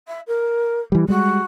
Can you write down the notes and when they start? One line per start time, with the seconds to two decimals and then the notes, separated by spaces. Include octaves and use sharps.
0.07 E5
0.27 A#4
0.92 E3 G3
1.08 G3 G#3 F#4